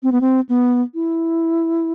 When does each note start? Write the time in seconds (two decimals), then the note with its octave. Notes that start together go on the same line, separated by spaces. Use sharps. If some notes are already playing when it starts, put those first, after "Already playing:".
0.03 C4
0.12 B3
0.21 C4
0.49 B3
0.94 E4